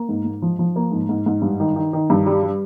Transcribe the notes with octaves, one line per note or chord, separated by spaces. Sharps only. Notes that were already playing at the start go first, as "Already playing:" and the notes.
Already playing: A#3
G#2
G#2
F3
F3
A#3
G#2
G#2
G#2
G2
D#3
D#3
D#3
G2
G3
G3